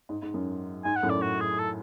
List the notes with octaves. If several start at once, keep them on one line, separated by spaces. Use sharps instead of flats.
G#2
G#2
F#2
G#2 G#5
F#5
F#2 A2
D5
F#4
G#4
A4